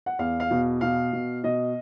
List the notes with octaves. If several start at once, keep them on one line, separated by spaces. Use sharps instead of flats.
F#5
E2 F5
F5
B2
B2 F5
B2
B2 D#5